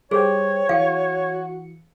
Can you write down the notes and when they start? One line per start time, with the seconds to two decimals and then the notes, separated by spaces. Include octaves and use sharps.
0.11 G3 G#4 C5 C#5 G5
0.69 E3 F#4 F5 C#7